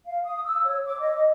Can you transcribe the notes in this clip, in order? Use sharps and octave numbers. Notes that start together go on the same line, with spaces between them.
F5
D#6
E6
C#5
D6
D#5